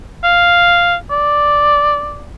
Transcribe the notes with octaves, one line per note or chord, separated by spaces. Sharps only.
F5
D5